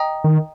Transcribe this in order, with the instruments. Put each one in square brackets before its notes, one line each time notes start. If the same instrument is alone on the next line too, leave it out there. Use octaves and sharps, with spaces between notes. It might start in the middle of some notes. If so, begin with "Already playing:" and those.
Already playing: [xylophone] D#5 G5 A#5 D#6
[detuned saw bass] D#3